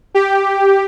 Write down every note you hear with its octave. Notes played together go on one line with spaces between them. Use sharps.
G4